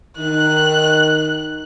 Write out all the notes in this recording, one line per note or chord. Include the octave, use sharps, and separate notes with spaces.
D#3 F#6